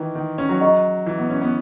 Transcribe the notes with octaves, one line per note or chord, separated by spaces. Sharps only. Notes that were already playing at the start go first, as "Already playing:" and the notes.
Already playing: D#3 E3 B4
D#3
C#4
F#3
G#4 D#5 F#5 A#5 C#6
E3
B3
C#4
B3